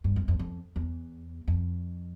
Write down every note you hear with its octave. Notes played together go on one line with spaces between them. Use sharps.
G2
F2
F2
F2
E2
F2